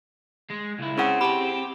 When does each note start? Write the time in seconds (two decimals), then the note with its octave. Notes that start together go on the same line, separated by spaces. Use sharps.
0.50 G#3
0.79 C#2 E4
0.97 C#3 C4 E4 F#5
1.21 G4 A5 B5